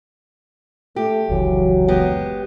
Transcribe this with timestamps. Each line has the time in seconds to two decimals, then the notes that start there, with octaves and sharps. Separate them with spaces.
0.96 A3 G4
1.29 F1 C#2 E3 F#3
1.88 G#3 B3 G4